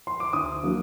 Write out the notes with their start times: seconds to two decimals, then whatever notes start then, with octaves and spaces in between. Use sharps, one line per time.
0.07 C6
0.20 D6
0.33 D2 D#6
0.63 D3 F#3 A#3 F#4